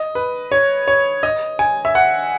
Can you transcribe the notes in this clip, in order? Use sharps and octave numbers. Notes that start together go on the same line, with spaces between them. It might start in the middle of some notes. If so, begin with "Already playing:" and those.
Already playing: D#5
B4
C#5
C#5
D#5
G#5
E5
F#5